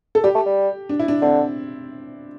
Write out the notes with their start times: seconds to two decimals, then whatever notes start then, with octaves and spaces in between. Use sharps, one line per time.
0.15 A4
0.24 G3 G4
0.35 A3
0.46 G3
0.89 D4
0.99 E4
1.08 D4
1.22 D3 C4